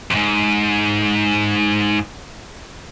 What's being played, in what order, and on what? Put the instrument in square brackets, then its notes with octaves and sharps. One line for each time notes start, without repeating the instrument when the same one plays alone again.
[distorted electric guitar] F2 G#2